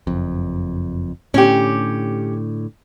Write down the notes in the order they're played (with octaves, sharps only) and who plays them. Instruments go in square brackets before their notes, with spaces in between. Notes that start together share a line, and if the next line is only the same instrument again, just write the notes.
[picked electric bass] F#1 F2
[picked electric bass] A2 D3 [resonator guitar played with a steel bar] C#4 G4